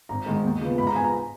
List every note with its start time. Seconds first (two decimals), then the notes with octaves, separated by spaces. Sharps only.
0.09 G#1 A#5
0.26 G#2 D#3 G#3
0.44 D#2
0.61 C#3 F3 B3
0.78 G#2 B5
0.87 A#5
0.95 F3 B3 G#5
1.04 A#5